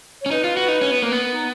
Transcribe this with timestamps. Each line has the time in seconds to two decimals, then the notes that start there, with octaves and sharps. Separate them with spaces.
0.21 C#4 C#5
0.31 D#4 B4
0.44 F4
0.57 F#4
0.68 D#4
0.81 C#4
0.91 B3
1.02 A#3
1.12 B3
1.31 D#4